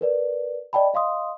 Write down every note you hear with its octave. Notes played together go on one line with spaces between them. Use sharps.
A#4 B4 D5
D5 D#5 G5 A5 B5
D#5 F5 C6 D#6